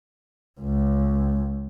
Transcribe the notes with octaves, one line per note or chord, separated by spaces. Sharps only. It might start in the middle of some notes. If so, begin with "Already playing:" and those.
C#2